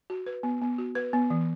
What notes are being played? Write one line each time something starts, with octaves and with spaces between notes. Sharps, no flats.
F#4
B4
B3
B3
F#4
B4
B3
E3